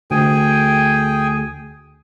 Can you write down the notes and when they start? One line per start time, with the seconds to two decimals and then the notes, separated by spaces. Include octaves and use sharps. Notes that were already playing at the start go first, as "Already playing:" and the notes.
0.11 D2 G#4 G5 G#5